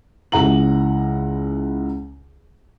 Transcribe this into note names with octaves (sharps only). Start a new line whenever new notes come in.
C#2 E4 F#5 A#5 F#7